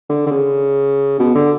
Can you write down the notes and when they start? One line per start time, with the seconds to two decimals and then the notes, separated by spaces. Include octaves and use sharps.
0.09 D3
0.26 D3
0.31 C#3
1.19 B2
1.35 D3